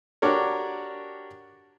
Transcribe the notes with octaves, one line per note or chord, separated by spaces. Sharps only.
D4 F#4 G4 A#4 C#5